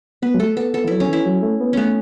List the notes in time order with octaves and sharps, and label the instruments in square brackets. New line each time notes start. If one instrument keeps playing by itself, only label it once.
[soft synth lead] B3 [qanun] B4
[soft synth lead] F#3
[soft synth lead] A3 [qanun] A4
[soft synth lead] B3 [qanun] A4
[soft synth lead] B3 [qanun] A4
[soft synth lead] E3
[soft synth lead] F#3 [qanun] E4
[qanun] C#4
[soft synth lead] E3 [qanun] E4
[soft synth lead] F#3
A3
B3
[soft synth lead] A3 [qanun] B3 C#4